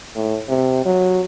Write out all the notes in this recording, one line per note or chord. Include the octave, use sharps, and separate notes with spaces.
A2
C3
F#3